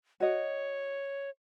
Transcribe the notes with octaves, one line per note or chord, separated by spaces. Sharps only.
F#4 C#5 D#5